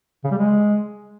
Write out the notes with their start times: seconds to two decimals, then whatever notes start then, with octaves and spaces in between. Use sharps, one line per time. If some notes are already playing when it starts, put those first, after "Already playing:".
0.24 C#3
0.31 G3
0.38 G#3